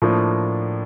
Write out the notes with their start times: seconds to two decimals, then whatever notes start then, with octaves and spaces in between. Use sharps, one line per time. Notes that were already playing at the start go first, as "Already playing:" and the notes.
0.02 A2 F3 A#3 D4 F4